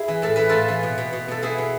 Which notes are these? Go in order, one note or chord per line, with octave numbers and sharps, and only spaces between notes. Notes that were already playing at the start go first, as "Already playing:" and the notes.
Already playing: E4 G#4
E3
A2 A4
E3 B4
A2 F4 A4
E3
B2
B2
B2
B2 A4
B2 E4 G#4
B2